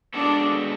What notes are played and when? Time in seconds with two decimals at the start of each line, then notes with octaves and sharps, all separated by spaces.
0.14 G#3 B3 D4 F#4 A4